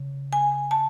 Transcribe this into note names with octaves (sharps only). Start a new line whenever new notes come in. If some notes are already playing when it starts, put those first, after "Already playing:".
Already playing: C#3
G#5
A5